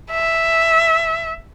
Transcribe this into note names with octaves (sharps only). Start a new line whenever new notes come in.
E5